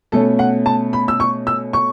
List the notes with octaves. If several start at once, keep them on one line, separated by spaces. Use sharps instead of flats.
B2 A3 C#4 A4
F#5
A5
B5
E6
C#6
E6
C#6